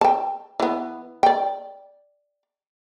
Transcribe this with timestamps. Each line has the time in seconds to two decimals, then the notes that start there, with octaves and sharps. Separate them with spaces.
0.01 G5 A5
0.60 E3 B3
1.23 D5 G5